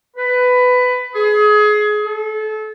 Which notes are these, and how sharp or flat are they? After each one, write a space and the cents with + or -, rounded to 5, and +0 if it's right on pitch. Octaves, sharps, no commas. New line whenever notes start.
B4 +15
G#4 +25
A4 -30